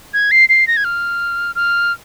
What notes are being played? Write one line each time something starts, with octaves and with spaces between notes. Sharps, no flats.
G#6
C7
C7
A#6
G#6
F6
F6